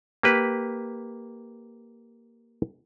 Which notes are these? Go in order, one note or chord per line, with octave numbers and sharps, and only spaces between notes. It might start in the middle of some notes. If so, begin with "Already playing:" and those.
A#3 G4 B4